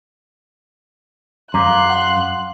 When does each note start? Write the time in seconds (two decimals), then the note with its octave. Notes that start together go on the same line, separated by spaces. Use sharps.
1.54 F#2 F5 A#5 C6 D6 F#6
1.90 F#5